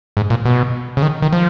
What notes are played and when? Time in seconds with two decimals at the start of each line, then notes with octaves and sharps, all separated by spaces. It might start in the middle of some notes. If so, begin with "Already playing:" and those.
0.17 G#2
0.30 A#2
0.45 B2
0.97 C#3
1.02 D#3
1.22 D#3
1.33 F3